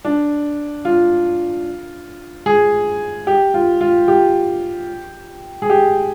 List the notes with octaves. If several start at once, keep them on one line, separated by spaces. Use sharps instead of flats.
D4
F4
G#4
G4
F4
F4
G4
G#4
G4